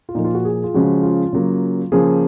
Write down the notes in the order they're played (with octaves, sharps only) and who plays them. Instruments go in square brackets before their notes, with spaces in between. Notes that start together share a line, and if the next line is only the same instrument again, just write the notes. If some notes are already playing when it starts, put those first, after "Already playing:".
[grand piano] F4
A#2 F3 A#3 D#4
F4
F#4
G#4
F4
C#3 F3 G#3 F#4
F4
C#3 F#3 A#3
C#3 F3 A#3 G#4